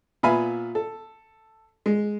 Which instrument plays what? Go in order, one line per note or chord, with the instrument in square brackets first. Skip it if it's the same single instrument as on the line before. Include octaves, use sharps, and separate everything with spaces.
[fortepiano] A#2 B3 E5 F5 G#5 B5
A4
G#3